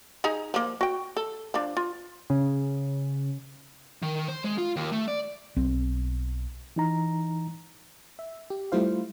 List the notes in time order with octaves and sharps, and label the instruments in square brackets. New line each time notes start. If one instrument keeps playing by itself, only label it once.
[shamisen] D#4 G#4 A#5
F3 A#3
F#4 G5
A4
F3 D4
F4
[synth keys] C#3
[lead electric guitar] D#3
C5
G#3
F4
D#2
A3
D5
[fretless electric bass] B1 C4
[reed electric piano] E3 D#4 A#5
[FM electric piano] E5
G4
G3 A3 E4 F4 C5 F5